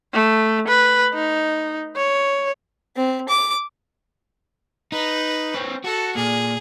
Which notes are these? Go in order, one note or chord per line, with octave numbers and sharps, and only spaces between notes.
A3
B4
D#4
C#5
C4
D6
D#4 B4
C4 C#5
F#4 A4
A#2 G#4